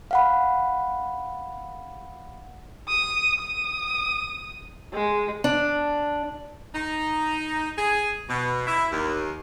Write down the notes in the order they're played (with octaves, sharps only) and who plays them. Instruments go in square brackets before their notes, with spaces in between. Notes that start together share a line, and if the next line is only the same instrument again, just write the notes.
[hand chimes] F5 F#5 B5
[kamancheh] D#6
D#6
G#3
[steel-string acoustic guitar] D4
[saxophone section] D#4
G#4
B2
E4
D#2